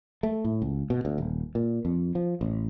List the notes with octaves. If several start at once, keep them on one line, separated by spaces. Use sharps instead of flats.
A3
A2
C#2
B2
D2
D#1
A#2
F2
F3
A1